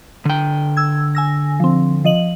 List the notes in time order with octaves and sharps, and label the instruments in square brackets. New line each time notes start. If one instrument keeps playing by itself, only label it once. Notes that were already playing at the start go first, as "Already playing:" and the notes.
[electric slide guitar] D3 G5
[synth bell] E6 G#6
G#5 E6 A#6
F3 C4
F3 D#5 F#7